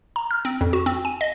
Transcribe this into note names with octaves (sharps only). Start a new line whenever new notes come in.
A#5
F6
C4
F2
F#4
C4
G#5
D#5